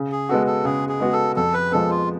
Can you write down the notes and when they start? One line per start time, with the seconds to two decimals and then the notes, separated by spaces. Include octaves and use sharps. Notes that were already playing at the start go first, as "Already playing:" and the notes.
Already playing: C#3
0.12 G#4
0.29 G#3 B3 F#4 A4
0.47 A4
0.65 C#3 G#4
0.89 G#4
1.00 G#3 B3 F#4
1.13 A4
1.36 F2 A4
1.54 B4
1.71 F3 G#3 B3 A4
1.90 F4